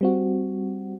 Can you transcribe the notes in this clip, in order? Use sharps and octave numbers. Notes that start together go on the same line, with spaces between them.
G3 C4 F#4